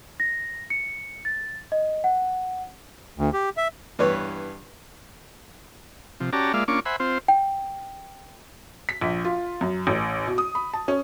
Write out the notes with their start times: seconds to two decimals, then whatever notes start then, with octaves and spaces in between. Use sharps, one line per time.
0.20 A#6
0.70 C#7
1.25 A6
1.72 D#5
2.04 F#5
3.18 D2
3.34 G4
3.57 E5
3.99 G2 E3 B3 B4 C#5
6.20 C3 F3
6.33 C#4 F#4 G4 D5 A5 A#5
6.54 G#3 A#3 F4 D5 E5 F5
6.68 A#3 C#4 D4 F4 C#6 D6
6.86 C5 E5 F#5 G#5 B5
7.00 C4 F4 C5
7.28 G5
8.89 B6
9.01 A#1
9.25 F4
9.61 F#2
9.87 A1
10.27 B2
10.38 D#6
10.55 B5
10.74 A5
10.88 C#4